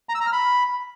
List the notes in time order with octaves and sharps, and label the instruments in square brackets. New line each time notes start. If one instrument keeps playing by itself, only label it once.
[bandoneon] A#5
E6
A#5
F6
B5